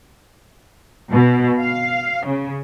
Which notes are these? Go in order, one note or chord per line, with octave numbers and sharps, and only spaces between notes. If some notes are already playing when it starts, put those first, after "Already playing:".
B2
F5
C#3